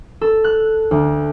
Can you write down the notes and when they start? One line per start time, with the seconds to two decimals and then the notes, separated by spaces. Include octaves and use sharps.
0.21 A4
0.44 F#6
0.91 D2